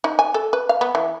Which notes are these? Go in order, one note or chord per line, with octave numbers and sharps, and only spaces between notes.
D#4
G#5
A4
B4
F5
B3
E3